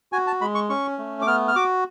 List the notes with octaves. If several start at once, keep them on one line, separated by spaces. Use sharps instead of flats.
F#4 G#5
A5
G#3 B5
C#6
C#4 C#6
A3
D6
B3 F6
F6
F#4 D6